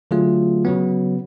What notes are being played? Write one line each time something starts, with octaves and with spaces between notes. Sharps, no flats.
D3 F#3 A3 F4 G#4
C#3 F#3 B3